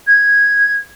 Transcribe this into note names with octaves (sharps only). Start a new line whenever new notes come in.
G#6